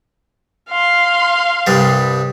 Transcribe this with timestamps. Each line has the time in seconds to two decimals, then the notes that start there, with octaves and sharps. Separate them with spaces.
0.69 F5 C6
1.67 C2 G2 G3